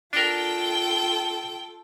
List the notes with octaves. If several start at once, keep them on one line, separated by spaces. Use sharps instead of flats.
D4 F4 A4 A#4 G5